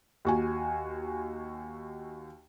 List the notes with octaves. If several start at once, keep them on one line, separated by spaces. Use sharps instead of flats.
D#2 F#4 G#5